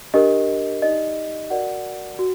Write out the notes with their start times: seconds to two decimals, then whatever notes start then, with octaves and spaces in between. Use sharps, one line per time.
0.14 D4 G4 A#4 D#5
0.81 D#4 G4 D5 D#5
1.50 F#4 A#4 D5 F#5
2.19 F#4